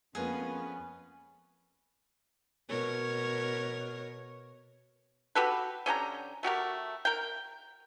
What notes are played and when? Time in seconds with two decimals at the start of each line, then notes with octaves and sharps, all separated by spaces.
0.15 F2 G#3 A#3 B3 C#4 F4 G#4 B4
2.70 B2 A#4 C#5
5.35 F#4 G4 A4 B4
5.86 D3 C#4 G4 A#5
6.43 A3 F#4 G4 A#4
7.05 A#4 G5